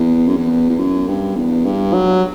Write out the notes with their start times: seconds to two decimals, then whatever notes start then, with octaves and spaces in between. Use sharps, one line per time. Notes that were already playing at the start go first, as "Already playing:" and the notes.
Already playing: E2
0.27 F#2
0.36 E2
0.70 E2
0.78 F#2
1.08 G2
1.36 E2
1.65 G2
1.93 F#3